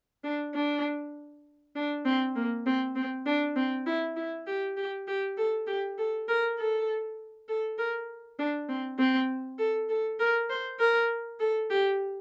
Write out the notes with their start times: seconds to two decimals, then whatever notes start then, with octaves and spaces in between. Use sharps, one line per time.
0.24 D4
0.55 D4
1.76 D4
2.05 C4
2.35 A#3
2.66 C4
2.96 C4
3.26 D4
3.56 C4
3.86 E4
4.16 E4
4.47 G4
4.77 G4
5.07 G4
5.37 A4
5.67 G4
5.98 A4
6.28 A#4
6.58 A4
7.48 A4
7.78 A#4
8.39 D4
8.68 C4
8.98 C4
9.59 A4
9.89 A4
10.20 A#4
10.50 C5
10.79 A#4
11.40 A4
11.70 G4